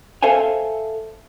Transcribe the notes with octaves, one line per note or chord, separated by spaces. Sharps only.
A4 C5 E5 F5 G#5